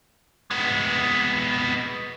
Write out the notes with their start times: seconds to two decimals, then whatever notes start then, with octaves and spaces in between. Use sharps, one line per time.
0.51 G#3 B3